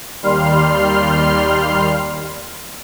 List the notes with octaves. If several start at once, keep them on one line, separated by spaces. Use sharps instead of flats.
D#2 G3 C6 F6